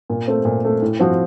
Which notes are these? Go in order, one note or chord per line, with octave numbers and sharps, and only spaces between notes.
A#2
A3 C4
A#2
A3 C4
A2
F3 C4 F#4